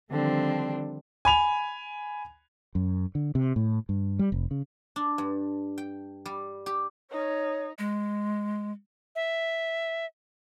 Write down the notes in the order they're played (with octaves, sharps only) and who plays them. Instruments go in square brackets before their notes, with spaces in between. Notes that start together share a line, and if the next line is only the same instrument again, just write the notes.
[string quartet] D3 D#3 F3 G3 C4 D4
[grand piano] G#5 B5 F7
[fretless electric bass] F#2
D3
C3
A2
G2
G3
F1
C#3
[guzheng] D4
G2
G5
G3
G4
[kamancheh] D#4 [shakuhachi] C#5
[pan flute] G#3
[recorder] E5